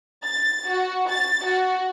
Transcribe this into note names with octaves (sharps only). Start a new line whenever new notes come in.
A6
F#4
A6
F#4